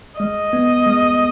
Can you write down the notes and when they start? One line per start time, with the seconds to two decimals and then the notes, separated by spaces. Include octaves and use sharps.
0.20 G#3 D#5
0.53 B3
0.86 G#3